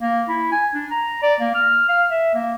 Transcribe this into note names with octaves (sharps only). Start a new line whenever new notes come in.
A#3
E4
G#5
D4
A#5
D5
A#3
F6
F5
E5
A#3